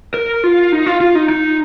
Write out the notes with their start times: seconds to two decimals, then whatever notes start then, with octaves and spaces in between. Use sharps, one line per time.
0.14 A#4
0.44 F4
0.72 D#4
0.86 F4
1.01 F4
1.15 D#4
1.29 D#4